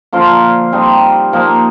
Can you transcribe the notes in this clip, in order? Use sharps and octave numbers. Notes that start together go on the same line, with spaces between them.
D3 F3 A#3 F4
D3 G3 C4 D#4
F3 A#3 D#4